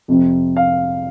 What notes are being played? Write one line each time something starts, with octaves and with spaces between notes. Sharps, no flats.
F2 C3 F3 C4
F5